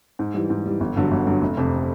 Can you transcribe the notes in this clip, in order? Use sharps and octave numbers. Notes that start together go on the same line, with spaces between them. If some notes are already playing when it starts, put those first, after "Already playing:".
G#2
E3 G3
G#2
E3 G3
G1
G2 D3 F#3
G1
G2 D3 F#3
F1
F2 C3